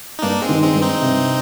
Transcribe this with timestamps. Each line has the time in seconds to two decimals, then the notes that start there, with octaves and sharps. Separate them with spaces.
0.19 D#4
0.22 G2 A#3 D4
0.42 G#3 C4
0.49 D#3
0.62 G#3 C4
0.75 G2
0.82 C4 D#4
1.02 C3